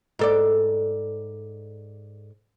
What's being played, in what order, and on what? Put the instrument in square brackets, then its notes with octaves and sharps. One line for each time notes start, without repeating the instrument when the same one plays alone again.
[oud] G#2 A4 D5